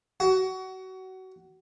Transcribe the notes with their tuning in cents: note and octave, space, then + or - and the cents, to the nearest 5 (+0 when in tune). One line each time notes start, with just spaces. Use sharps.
F#4 +25